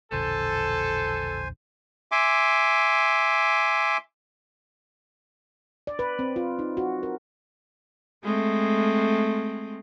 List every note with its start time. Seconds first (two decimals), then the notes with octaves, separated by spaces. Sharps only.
0.12 E1 A#1 D3 A4 C5 G#5
2.12 E5 G#5 C6 D6
5.87 D5
5.99 B4
6.19 C4
6.36 F4
6.59 D#4
6.77 F#4
7.03 A#4
8.23 G#3 A3 C4